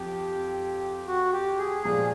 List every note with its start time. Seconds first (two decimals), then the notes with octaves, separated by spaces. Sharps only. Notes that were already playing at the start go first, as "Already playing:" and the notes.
Already playing: F2 F3 G4
1.07 F#4
1.33 G4
1.58 G#4
1.83 A#2 F3 G#3 G#4